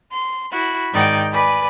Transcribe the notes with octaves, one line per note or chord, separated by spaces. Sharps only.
C6
E4 F#4 B5
G#2 D#3 D#4 D5 G5
B4 D5 G#5 B5